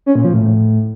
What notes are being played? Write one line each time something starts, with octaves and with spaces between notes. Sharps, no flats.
C#4
A#2
F3
A2